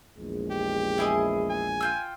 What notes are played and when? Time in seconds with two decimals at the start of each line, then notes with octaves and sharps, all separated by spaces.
0.18 A#1 E2 G#3
0.51 G4
0.98 E4 G#4 D#5
1.50 G#5
1.81 F4 G5 E6